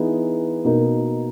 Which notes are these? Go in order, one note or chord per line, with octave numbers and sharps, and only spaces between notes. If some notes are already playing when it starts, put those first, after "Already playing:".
Already playing: E3 B3 D#4 G#4
B2 A#3 D#4 A#4